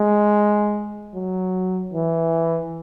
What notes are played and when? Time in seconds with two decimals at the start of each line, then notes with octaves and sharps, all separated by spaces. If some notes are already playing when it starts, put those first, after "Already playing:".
Already playing: G#3
1.15 F#3
1.93 E3